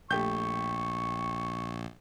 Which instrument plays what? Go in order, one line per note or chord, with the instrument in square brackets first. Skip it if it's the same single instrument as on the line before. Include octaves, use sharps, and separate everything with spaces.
[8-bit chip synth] A#1 [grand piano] A3 G4 G6 [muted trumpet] C#6